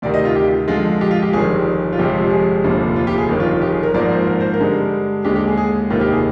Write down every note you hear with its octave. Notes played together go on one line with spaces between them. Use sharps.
D2 C3 D#3 D5
D#5
F4
G4
F2 D3 F3 G#3 F4
G4
F4
G4
G1 F2 D#3 G3 G#4
F4
G1 F2 C3 F3 G#3 G4
G4
G#4
F1 D#2 D3 F3
F4
G4
G#4
G1 F2 D#3 G4
F4
F4
G4
G#4
A#4
G#1 G#2 F3 A#3 D5
C5
A#4
C5
A#4
G2 D3 G#3
D#2 D3 G#3 G4
G4
G#4
G#4
F1 D#2 D#3 F4
G4
G#4